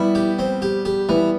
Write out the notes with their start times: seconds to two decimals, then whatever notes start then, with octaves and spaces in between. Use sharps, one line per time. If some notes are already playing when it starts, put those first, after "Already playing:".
Already playing: G3 B3 E4
0.15 G4
0.39 C4
0.62 G4
0.85 G4
1.09 E3 G3 B3